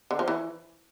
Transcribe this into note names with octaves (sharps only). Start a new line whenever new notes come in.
D3
F3
E3